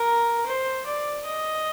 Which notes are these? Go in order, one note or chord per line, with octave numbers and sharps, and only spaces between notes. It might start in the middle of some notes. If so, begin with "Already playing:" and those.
Already playing: A#4
C5
D5
D#5